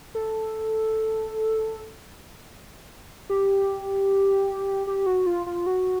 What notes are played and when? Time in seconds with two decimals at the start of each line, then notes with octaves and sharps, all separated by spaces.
0.15 A4
3.30 G4
4.87 G4
5.06 F#4
5.26 F4
5.46 F4
5.66 F#4